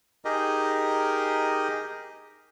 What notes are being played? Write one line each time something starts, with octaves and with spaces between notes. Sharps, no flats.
D#4 G4 G#4 A#4 D#5